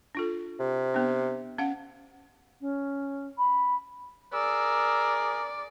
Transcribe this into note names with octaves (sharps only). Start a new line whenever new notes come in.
D4 F4 A4
C3
B3 D4
C#4 F5 F#5
C#4
B5
G#4 A#4 D5 E6